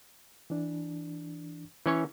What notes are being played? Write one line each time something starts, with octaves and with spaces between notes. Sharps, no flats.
E3 D4
E3 C#4 C#5